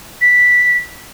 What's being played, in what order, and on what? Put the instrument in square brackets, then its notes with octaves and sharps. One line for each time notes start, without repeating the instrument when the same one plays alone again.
[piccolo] B6